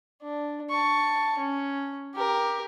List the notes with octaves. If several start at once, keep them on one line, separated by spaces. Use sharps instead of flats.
D4
A5 C#6
C#4
G4 A#4